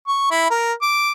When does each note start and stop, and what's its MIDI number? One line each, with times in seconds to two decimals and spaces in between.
0.07 0.30 85
0.31 0.47 64
0.51 0.73 70
0.82 1.12 86